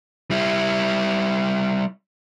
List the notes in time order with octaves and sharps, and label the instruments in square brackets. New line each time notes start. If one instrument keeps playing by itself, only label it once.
[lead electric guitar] G3 E4